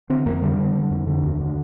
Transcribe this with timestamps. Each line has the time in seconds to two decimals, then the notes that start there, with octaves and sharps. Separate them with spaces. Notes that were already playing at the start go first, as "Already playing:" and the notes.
0.10 D3 C4
0.26 F2 A#3
0.42 D3 G3
0.58 D3
0.75 D3
0.91 F2
1.07 D3
1.23 D#2
1.40 D3